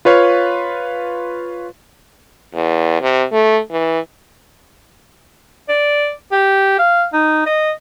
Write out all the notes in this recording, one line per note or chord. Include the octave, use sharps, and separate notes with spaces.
F4 B4 C#5 F5
E2
C3
A3
E3
D5
G4
F5
D#4
D#5